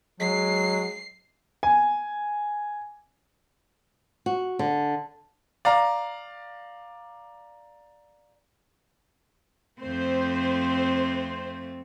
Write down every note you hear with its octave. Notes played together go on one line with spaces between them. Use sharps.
F#3 G#3 C7
G#5
F#4
D3
D5 F5 A#5
F2 A3 C4 C5